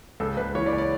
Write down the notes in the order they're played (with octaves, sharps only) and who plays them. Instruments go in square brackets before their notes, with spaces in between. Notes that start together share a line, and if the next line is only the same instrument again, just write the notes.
[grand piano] C#2 A4
C#2 B4
E3 C#5
D5
C#2 C#5
D5